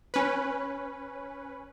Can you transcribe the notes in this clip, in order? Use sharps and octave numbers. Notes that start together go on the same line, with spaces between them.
C#4 B4